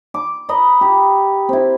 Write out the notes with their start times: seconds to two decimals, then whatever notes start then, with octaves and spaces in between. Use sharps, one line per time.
0.14 D6
0.49 B4 D#5 A#5 B5
0.81 G4
1.49 C4 E4